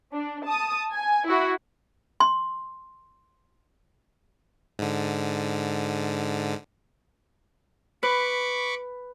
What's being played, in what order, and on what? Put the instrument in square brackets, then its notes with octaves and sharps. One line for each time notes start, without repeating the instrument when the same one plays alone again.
[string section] D4
A5 D#6
G#5
E4 F#4
[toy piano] C6
[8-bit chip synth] G#2 D3
[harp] B4 [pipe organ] B5 C#6 D6